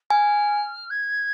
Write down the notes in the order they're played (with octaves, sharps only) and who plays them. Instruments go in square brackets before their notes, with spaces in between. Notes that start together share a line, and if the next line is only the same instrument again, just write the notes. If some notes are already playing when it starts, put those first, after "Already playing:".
[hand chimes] G#5 [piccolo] F6
[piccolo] G#6